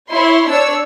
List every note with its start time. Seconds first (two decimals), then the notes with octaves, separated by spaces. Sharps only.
0.11 E4 C#5 C6
0.49 D4 C#5 E6